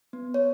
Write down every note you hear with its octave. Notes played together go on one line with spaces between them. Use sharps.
B3
C#5